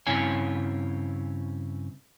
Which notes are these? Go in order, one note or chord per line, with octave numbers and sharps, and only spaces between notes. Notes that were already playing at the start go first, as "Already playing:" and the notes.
G2 C#3 C4 E4 C#5 G#5